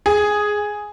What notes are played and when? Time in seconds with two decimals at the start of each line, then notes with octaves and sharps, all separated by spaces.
0.06 G#4